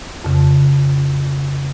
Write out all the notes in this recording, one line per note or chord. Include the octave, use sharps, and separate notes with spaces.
F2 C#3